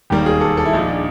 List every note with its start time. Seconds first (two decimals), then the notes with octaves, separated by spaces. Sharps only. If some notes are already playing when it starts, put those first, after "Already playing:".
0.10 E1 D#2 D#3 G3 A#3 G4
0.26 G#4
0.41 A4
0.57 A4
0.66 E4
0.73 A#1 A#2 F3 D#4
0.88 D4